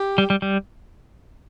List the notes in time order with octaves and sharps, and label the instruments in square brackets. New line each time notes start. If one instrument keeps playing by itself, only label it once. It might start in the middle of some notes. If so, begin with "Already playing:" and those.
Already playing: [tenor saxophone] G4
[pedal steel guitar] G3
G3
G3